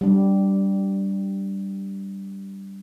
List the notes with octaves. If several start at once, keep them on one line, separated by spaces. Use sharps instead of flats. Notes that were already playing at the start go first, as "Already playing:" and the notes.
G3 D4